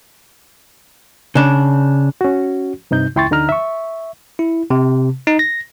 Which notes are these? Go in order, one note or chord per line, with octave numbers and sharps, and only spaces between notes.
C#3 D4
C#4 F#4
G2 C3 D#4 G6
C#2 E4 G5 C6 C#6 A6
D2 D3 D#4 A#5 F6
E5 C#6
E4
C3
D#4
A#6